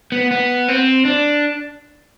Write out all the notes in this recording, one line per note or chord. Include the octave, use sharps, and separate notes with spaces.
B3
B3
C4
D4